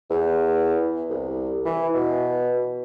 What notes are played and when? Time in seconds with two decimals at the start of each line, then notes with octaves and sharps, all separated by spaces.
0.10 E2
1.10 C2
1.65 E3
1.94 B2